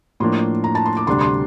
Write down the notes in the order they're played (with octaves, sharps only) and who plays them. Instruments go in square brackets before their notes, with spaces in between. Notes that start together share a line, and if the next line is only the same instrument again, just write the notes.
[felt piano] A2 F3 A#3 D4 C6
A#5
A5
C6
D6
D2 C3 G3 D4 C6
C6